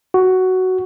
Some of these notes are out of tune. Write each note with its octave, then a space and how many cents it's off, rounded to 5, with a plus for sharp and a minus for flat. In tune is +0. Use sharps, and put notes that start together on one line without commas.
F#4 +10